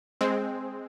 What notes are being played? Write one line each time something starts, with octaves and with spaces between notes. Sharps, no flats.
G#3 C4